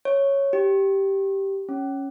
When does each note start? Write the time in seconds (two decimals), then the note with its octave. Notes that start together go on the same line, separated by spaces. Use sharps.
0.05 C#5
0.53 G4
1.69 C#4